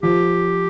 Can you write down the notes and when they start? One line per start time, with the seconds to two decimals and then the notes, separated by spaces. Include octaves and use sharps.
0.03 F3 G4